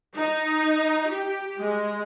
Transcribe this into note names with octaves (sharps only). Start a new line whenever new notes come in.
D#4
G4
G#3